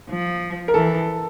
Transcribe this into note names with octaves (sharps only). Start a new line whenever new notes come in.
F3
A#4
E3 A4